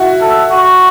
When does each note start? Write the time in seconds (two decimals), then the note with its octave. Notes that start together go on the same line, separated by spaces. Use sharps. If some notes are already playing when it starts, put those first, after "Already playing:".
Already playing: E4 F#4
0.21 A4
0.51 F#4